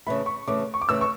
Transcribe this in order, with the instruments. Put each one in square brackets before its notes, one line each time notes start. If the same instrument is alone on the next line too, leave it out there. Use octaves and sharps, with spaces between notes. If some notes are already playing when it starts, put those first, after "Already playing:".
[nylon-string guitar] C#3 E3 A3 [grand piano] B5
[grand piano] C#6
[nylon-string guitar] C#3 E3 A3 [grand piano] D6
[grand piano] C#6
D6
[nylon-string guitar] C#3 E3 A3 [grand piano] E6
[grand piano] C#6